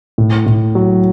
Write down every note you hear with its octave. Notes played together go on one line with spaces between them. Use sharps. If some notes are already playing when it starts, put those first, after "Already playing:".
A2
A2
F#3